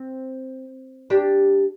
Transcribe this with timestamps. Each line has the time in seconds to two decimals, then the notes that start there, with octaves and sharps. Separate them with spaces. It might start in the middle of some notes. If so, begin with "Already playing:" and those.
Already playing: C4
1.10 D4 G4